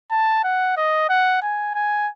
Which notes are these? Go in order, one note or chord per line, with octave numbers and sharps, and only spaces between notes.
A5
F#5
D#5
F#5
G#5
G#5